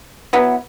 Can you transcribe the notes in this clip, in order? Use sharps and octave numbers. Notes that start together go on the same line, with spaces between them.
F#3 B3 E4